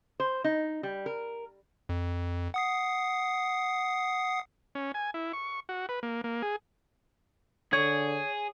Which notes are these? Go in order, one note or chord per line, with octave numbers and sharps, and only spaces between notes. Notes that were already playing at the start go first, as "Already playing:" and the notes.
C5
D#4
G3
A#4
F2
F#5 D#6 C7
C#4
G#5
E4
C#6
F#4
B4
A#3
A#3
G#4
D3 G#4 C#5 G#6